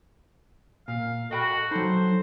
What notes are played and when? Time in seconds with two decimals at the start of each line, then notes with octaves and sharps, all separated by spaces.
0.88 A#2 F5
1.31 F#4 A4 D#5 G5 B5
1.71 F#3 D#4 C5